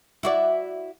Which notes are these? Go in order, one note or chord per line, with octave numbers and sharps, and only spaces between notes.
E4 F#4 D5